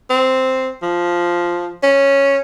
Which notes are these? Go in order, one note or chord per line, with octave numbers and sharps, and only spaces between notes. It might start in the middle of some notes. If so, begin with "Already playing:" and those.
C4
F3
C#4